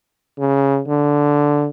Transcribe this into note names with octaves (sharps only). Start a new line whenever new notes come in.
C#3
D3